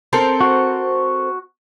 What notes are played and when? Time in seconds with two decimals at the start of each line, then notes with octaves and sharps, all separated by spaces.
0.13 C4 A4 A#4
0.41 F#4